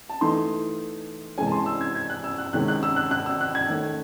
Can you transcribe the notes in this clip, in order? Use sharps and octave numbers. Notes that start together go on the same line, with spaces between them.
A5
E3 A3 D#4 C6
C3 E3 G#3 C#4 G#5
A5
C6
E6
G#6
G#6
F#6
E6
F#6
C3 D#3 G#3 C#4 F#6
F#6
E6
F#6
F#6
E6
F#6
G#6
D#3 A3 C#4